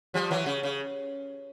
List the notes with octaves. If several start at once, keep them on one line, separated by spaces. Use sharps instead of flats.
F3 G3
E3 F#3
C#3
C#3